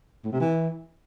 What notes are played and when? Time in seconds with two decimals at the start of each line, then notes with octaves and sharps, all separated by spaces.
0.24 A2
0.32 C3
0.40 E3